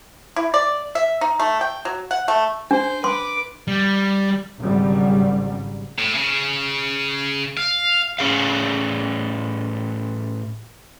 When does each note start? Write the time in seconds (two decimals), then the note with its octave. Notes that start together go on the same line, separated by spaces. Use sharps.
0.36 E4
0.54 D5
0.95 E5
1.21 D#4
1.40 A3
1.61 G5
1.85 F#3
2.11 F#5
2.28 A3
2.71 D4 C5
3.04 B4 C6 D6
3.68 G3
4.59 G#1 G#2 C#3 F#3 G3
5.98 A2
6.15 C#3 C#4
7.57 F5
8.19 A2 C#4 G#4 F5